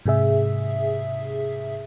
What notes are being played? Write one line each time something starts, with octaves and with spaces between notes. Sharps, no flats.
G#2 C3 G#4 E5